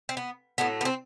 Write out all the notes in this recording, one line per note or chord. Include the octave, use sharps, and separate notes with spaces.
C4
B3
A2 F#3 A3 B3
B3
C4